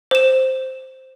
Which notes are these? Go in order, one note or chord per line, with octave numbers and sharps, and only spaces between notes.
C5 E7